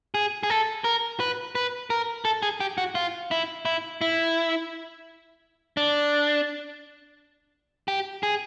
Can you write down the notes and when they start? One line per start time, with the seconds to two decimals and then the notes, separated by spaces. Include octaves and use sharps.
0.15 G#4
0.43 G#4
0.50 A4
0.84 A#4
1.20 B4
1.55 B4
1.90 A#4
2.25 A4
2.43 G#4
2.60 G4
2.78 F#4
2.95 F4
3.31 E4
3.65 E4
4.01 E4
5.77 D4
7.88 G4
8.23 G#4